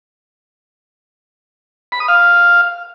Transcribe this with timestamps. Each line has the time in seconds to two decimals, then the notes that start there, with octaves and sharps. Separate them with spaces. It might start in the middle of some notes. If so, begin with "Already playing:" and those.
1.92 B5
2.00 D#6
2.08 F5